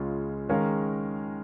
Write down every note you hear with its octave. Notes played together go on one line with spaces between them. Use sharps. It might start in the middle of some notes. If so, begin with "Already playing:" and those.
Already playing: C#2 C#3 G#3 C#4 F4
D#3 G#3 C#4 A#4 F5